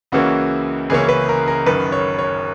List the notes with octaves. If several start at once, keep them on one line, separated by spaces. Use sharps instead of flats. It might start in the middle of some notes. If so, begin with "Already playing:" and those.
C#2 C#3 E3 A#3 C#4 F#4
C#2 C#3 E3 A#3 C#4 G#4
B4
A#4
A#4
F#1 F#2 D#3 B4
C#5
C#5